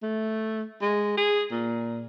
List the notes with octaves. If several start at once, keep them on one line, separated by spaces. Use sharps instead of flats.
A3
G#3
G#4
A#2